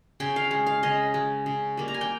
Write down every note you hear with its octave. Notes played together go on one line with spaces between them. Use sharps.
C#3 G5
F5
G#3
F5
C#3 D#5
G#3
C#3
G3 A#3
A#5
G#5
G5